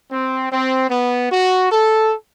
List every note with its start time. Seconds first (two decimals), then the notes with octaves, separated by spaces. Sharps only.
0.11 C4
0.51 C4
0.90 B3
1.31 F#4
1.71 A4